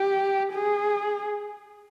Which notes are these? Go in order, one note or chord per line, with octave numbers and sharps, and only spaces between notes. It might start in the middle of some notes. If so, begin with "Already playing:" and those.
Already playing: G4
G#4